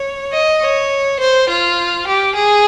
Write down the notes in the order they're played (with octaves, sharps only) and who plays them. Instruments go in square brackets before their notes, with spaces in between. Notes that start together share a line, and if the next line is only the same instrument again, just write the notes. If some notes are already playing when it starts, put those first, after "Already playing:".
Already playing: [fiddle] C#5
D#5
C#5
C5
F4
G4
G#4